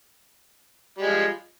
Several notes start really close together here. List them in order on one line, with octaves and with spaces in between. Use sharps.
G3 G#3 F3